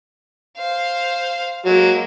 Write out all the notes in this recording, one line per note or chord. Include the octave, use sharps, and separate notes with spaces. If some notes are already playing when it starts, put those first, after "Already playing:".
C5 F5
F#3 G#3 A#3